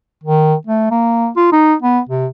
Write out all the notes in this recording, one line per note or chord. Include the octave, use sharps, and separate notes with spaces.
D#3
A3
A#3
F4
D#4
B3
C3